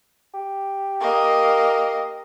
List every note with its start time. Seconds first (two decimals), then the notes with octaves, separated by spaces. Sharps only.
0.34 G4
1.01 A#3 D#5